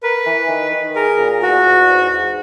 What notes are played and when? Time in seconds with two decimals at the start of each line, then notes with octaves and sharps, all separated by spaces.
0.03 A#4 B4
0.26 E3
0.49 D#3
0.73 D#3
0.96 G#4 A#4
1.18 A#2
1.42 E2 F#4
1.66 E2
1.88 G#2
2.11 G#2